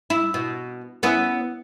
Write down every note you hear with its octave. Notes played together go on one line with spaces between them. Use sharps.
E4
B2
B3 C#4 E4